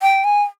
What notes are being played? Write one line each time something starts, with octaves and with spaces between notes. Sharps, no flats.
G5
G#5